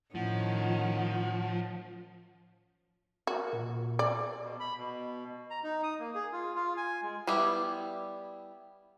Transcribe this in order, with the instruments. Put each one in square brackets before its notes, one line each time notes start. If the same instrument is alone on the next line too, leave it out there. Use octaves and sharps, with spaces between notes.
[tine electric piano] A2 [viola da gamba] D#3 C#4 [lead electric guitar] F3 [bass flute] F#5
[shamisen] F#4 [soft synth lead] A#4
[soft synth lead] A#2
[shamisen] D5
[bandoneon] B2
B5
B2
A#5
D#4
D#6
A#3
G#4
F4
F4
G#5
G#3
[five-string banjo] G3 B3 E4 G4